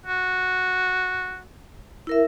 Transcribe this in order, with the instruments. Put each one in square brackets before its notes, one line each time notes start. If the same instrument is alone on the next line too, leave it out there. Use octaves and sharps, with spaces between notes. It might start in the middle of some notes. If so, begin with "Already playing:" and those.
[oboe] F#4
[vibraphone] E4 A#4 E5